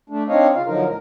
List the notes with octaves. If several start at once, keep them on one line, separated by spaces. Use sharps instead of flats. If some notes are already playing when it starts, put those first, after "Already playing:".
A3 D4
C4 D4 D#4 C#5 D#5 F5
C#3 F4 F5
D3 F3 F#3 D#4 A#4
D2 A2 A#4